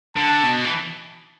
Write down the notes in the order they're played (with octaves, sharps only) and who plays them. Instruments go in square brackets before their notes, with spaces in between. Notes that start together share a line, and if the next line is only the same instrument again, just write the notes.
[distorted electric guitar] D3 [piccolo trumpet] A5
[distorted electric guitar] B2
E3